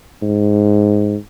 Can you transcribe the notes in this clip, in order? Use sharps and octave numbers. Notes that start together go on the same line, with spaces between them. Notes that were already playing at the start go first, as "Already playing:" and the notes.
G#2